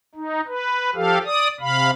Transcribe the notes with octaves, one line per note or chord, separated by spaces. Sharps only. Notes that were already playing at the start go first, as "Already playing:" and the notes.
D#4
B4
F3 G4 A4 F5
D5 D#6
C3 F5 B5